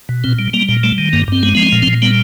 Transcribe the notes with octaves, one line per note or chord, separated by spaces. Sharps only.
B2
A#2 C4
G3
G3 A#3
A#2
G3 A3
D#3
G2 A#3
G2 C4
G#3 B3
F3 B3
C4
A#2
C4
A#2
G3 B3